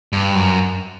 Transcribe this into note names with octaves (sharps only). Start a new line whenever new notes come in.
G2
F#2